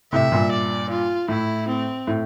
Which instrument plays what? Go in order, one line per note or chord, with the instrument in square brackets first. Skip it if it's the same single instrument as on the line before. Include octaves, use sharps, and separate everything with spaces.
[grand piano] A2 C3 [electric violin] E5
[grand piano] G2 A#2
[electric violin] D5
F4
[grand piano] A2 [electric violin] E4
[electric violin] C4
[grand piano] A2